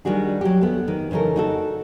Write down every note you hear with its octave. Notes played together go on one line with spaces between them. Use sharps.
D#3 G3 D4 F#4 G#4
F#3 G4
A3 B3
D#3
C#3 E3 D#4 A4 A#4
D#4 F#4 A4